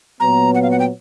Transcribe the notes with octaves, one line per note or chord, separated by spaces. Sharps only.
A#2 F#3 B3 A#5
F#5
F5
F#5
G5